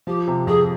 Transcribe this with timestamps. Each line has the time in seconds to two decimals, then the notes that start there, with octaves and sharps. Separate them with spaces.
0.07 F3 G4
0.27 C3
0.47 F2 G#4